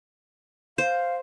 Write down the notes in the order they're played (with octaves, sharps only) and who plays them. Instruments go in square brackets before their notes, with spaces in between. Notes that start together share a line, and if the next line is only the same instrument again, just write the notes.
[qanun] C5 [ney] F5